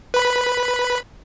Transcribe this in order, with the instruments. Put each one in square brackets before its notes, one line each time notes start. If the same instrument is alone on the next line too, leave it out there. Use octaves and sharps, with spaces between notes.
[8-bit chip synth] B4 B5